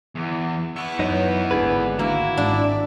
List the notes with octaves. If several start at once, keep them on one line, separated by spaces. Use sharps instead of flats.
E2
B3 E4 C#6 F#6
F#2 D#4 B4 C#5
G#1 D2 D4 G#4 B4
A#3 E4 F#4
G#1 G#2 D4 D5